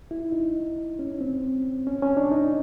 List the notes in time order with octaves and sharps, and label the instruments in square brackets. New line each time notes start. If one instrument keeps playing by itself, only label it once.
[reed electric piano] E4
D#4
C#4
C4
C#4
C#4
D4
D#4